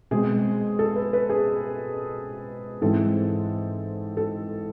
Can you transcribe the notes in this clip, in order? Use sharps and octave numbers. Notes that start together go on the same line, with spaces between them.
B2 G#3 C4 G#4
A4
B4
B4
G#4
G#2 E3 G#3 C4 A4
A4